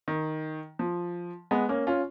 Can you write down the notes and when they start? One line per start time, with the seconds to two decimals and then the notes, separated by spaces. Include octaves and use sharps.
0.08 D#3
0.79 F3
1.51 G#3 B3
1.69 A#3 C#4
1.87 C#4 F4